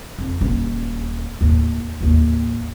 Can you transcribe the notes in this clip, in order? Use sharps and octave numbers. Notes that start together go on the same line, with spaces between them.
F2
D#1 C#4
D#2 A2
A1 D#2